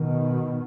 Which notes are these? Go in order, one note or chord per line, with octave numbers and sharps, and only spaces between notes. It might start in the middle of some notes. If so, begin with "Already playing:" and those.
Already playing: B2 D#3